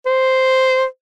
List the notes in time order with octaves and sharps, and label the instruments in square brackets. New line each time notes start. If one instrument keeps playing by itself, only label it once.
[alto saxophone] C5